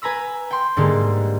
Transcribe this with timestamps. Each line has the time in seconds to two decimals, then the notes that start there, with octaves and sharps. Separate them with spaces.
0.02 B4 G#5 A#5 B5 E6
0.51 G5 C6
0.77 G#2 D3 G3 G#3 A#3